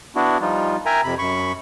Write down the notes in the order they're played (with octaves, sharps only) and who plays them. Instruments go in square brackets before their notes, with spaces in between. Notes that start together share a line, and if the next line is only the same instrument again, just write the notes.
[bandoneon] B3 D4 E4 F#4
F3 G3 D#4 F4
A#4 E5 G5 G#5 A#5
F2 C3 B5
F#2 B5 C#6